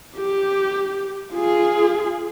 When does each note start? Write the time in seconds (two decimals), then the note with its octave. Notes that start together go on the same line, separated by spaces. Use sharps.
0.17 G4
1.33 F4 G#4